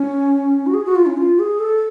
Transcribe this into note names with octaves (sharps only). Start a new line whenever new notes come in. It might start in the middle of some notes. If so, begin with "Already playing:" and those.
Already playing: C#4
F#4
G#4
F#4
F4
C#4
F4
G#4
A4